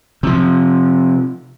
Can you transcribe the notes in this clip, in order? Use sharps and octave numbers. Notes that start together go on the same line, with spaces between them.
C3 F3